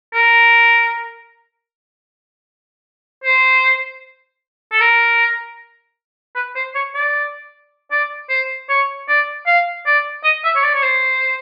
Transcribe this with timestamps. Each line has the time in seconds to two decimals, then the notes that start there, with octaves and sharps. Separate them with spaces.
0.13 A#4
3.24 C5
4.72 A4
4.81 A#4
6.35 B4
6.55 C5
6.75 C#5
6.94 D5
7.92 D5
8.29 C5
8.69 C#5
9.08 D5
9.47 F5
9.86 D5
10.24 D#5
10.44 E5
10.56 C#5
10.64 D5
10.74 C#5
10.83 C5